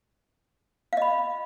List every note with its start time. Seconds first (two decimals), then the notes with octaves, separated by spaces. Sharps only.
0.93 F5
0.97 D#5
1.02 B5